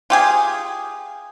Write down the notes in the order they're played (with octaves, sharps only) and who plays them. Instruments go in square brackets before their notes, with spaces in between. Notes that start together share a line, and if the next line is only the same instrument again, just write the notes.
[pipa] F4 G4 G#4